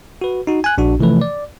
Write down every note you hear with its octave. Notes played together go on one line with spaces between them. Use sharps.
F#4 B4
D#4 F#4
G#5 F#6
A#1 D4 F#4
C3 E3 F3 A3 B4
D5